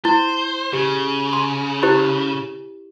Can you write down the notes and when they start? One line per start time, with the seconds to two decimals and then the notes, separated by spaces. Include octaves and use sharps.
0.05 E4 C5
0.73 C#3 G4
1.33 C6
1.83 E4 G4 C5